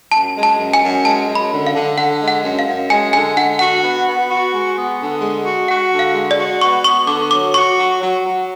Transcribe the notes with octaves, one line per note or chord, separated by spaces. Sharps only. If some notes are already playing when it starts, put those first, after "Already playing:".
F#2 A5
G#3
A5
F#2
G#5
F#2
G#3 A5
F#2
B5
D3
F5
D3
D3 F#5
G#3
F#5
F#2
F5
F#2
G#3 G#5
D3 G#5
D3 F#5
F#4 F#5
B3
B3
F#4
G#3
B3
D3
G#3
F#4
F#4 F#5
D3
F5
G#3
D5
F#4
B3 C#6
B3 C#6
D3 D6
F#3 D6
F#4 C#6
F#3
F#3
F#3